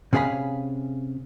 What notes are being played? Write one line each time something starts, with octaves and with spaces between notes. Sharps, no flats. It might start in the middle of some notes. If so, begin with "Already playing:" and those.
C3 C#4 G#4 D5 F5 B5